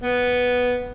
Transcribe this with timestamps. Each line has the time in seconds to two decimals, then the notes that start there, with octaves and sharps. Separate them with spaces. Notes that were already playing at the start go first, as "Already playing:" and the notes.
0.03 B3